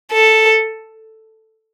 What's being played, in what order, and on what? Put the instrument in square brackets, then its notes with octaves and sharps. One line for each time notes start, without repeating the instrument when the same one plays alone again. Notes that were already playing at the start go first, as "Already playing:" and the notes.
[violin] A4